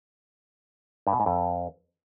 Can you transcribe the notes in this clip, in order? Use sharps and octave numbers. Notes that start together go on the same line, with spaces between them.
G2
B2
G#2
F2